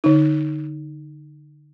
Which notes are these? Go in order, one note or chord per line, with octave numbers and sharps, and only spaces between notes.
D3 D#4